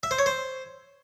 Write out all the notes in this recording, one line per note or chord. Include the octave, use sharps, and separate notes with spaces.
E5
C5
C#5
C5